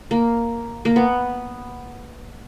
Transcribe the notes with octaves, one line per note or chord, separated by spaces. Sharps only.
A#3
A#3
B3